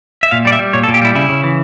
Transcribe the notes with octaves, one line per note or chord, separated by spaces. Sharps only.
E5
A#2 F5
G3 D5
E5
G3
A#2 C#5
A4
A#2
G4
G3 E4
C#3 E4
C#3
E3